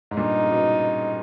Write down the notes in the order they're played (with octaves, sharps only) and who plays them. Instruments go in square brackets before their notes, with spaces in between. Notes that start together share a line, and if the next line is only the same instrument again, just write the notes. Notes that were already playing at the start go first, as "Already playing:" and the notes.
[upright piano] G#2
[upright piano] G2 A#2 [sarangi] D#4
[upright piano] C#3
B2